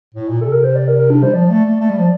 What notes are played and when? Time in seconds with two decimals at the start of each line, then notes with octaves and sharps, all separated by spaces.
0.14 A2
0.28 A#2
0.41 C3 A4
0.52 A#4
0.64 C5
0.76 D5
0.88 A#4
0.99 A#4
1.10 D4
1.23 G3 C5
1.33 F3 D5
1.49 A3
1.65 A3
1.80 A3
1.90 G3
1.98 F3